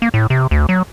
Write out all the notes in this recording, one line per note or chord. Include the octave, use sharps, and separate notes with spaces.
A#3
A2
C3
D2
F#3